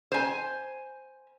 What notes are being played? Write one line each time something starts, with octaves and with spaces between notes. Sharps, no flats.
C5 G#5